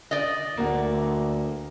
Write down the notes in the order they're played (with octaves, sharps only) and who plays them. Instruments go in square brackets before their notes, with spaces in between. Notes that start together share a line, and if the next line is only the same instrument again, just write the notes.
[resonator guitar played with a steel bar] D5 D#5
[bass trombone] D2 [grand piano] A#3 F#5